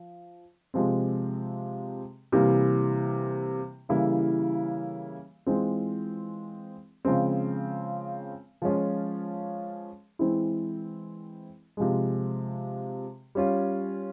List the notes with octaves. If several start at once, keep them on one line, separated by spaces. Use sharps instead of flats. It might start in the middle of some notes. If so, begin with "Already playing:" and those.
Already playing: F3
C3 F3 G#3 C4
C3 E3 G3 A#3
C#3 E3 G3 A#3 E4
E3 G#3 C4 F4
C#3 F3 G#3 C4
F3 G#3 C#4 F4
E3 G#3 C4 E4
C3 F3 G#3
G3 C#4 F4